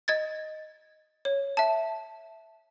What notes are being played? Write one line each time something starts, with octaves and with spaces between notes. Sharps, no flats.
D#5 G#6 A6
C#5
E5 A5